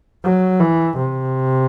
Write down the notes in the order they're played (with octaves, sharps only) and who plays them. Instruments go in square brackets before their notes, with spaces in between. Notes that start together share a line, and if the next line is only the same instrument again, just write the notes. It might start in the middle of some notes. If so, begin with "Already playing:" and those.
[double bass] F#3
E3
C3